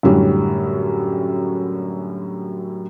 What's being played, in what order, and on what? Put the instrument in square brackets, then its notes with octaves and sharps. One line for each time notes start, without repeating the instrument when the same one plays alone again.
[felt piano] F#2 A2 D3 F#3 G3 C#4